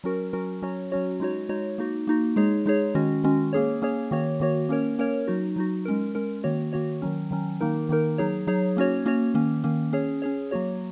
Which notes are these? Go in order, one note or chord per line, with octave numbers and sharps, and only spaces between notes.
F#3 C#4 F#4 A#4
F#3 C#4 F#4 A#4
F#3 C#4 F#4 C#5
F#3 C#4 F#4 C#5
G#3 D#4 F#4 C#5
G#3 D#4 F#4 C#5
A#3 D#4 F#4
A#3 D#4 F#4
G#3 D#4 G#4 C#5
G#3 D#4 G#4 C#5
D#3 G#3 C#4 F#4
D#3 G#3 C#4 F#4
A#3 C#4 G#4 C#5
A#3 C#4 G#4 C#5
D#3 A#3 F#4 C#5
D#3 A#3 F#4 C#5
A#3 C#4 A#4 C#5
A#3 C#4 A#4 C#5
F#3 D#4 F#4
F#3 D#4 F#4
G#3 C#4 A#4
G#3 C#4 A#4
D#3 A#3 F#4 C#5
D#3 A#3 F#4 C#5
D#3 F#3 C#4
D#3 F#3 C#4
D#3 A#3 D#4 A#4
D#3 A#3 D#4 A#4
F#3 D#4 G#4 C#5
F#3 D#4 G#4 C#5
A#3 C#4 F#4 C#5
A#3 C#4 F#4 C#5
D#3 A#3 C#4
D#3 A#3 C#4
C#4 G#4 C#5
C#4 G#4 C#5
F#3 A#3 F#4 C#5